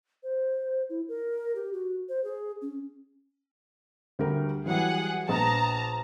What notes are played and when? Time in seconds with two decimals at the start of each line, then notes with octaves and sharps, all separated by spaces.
0.23 C5
0.90 E4
1.08 A#4
1.55 G4
1.73 F#4
2.09 C5
2.24 G#4
2.62 C#4
4.19 D2 G3 A#4
4.66 E3 F#3 G3 G#4 F#5
5.29 A#1 B3 A5 A#5 D#6